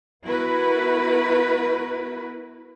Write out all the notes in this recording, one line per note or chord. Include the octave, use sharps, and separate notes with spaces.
B3 E4 F#4 A#4 B4